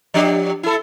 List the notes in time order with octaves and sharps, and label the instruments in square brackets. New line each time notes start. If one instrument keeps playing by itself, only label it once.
[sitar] F3 D4 G4
E4 A4